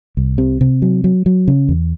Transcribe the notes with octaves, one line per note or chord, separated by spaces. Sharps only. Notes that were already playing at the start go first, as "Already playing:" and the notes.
C2
C3
C3
F#3
F#3
F#3
C#3
E2